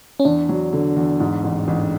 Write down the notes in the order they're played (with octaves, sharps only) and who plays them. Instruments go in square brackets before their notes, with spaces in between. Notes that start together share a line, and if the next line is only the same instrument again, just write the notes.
[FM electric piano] C#4
[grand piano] E2 [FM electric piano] D4
[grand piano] F#3
D3
E2
G#2
A1
A1